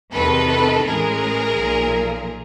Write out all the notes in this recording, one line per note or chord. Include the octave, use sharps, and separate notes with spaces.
E2 C3 D#3 A4 B4
A1 A2 E3 G#3 G#4 A#4
B1 A#2 F3